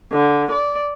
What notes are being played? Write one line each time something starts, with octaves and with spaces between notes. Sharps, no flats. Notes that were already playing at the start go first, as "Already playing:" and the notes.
D3
D5